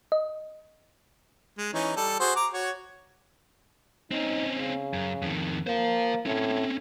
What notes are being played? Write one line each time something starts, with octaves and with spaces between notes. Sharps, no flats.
D#5
G#3
E3 C#4 D#4
G3 A4
F#4 G#4 C5
A#5 D6
F#4 C#5
C4 C#4 D#4
C#3
F#2
F2 D#3
A#3 C5 F5
A2 C4 C#4